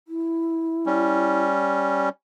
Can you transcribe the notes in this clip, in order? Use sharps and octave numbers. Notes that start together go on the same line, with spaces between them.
E4
G3 C#4